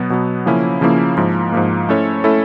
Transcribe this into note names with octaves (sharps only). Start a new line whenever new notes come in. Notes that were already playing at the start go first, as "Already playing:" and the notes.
Already playing: B2 F#3 B3
B2 F#3 B3
C#3 F3 A#3 C#4 E4
C#3 F3 A#3 C#4 E4
G#2 F3 A#3
G#2 F3 A#3
A3 C#4 E4 A4 C#5
A3 C#4 E4 A4 C#5